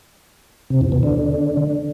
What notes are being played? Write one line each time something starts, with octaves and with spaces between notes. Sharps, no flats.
C3
E2
B2
D3